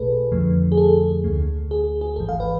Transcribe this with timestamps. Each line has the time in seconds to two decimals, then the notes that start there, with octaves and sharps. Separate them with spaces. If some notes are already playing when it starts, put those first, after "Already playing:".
Already playing: B1 B2 A3 G#4 A4 B4
0.32 F2 D3 F3 A3
0.72 G#4
0.77 A4
1.24 D2 D3 A3
1.71 G#4
2.01 G#4
2.16 G#1 G#2 E3 A4
2.29 F5
2.40 B4